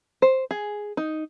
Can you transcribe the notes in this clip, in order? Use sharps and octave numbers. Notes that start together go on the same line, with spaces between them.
C5
G#4
D#4